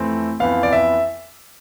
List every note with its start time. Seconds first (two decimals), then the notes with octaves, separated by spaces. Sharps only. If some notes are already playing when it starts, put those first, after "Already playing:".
Already playing: F2 E3 A3 C4
0.40 F2 E3 B3 F5
0.63 D5
0.73 E5